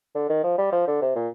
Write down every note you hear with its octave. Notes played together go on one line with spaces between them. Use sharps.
D3
D#3
F3
G3
F3
D3
C3
A#2